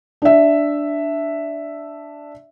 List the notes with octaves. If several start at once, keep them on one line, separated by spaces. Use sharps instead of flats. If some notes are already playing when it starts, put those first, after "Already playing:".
D4 E5